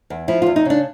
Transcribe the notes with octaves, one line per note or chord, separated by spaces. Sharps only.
E2
F3 E4
F4
E2
D#4
C#3 D4